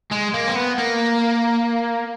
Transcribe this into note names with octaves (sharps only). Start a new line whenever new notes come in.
G#3
A#3
C4
B3
A#3